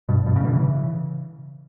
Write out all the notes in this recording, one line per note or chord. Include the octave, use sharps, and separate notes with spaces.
G2 B2
G2 B2
A2 C#3
B2 D3
C#3 E3